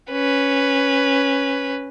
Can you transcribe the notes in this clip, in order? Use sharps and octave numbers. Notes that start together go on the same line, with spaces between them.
C#4 B4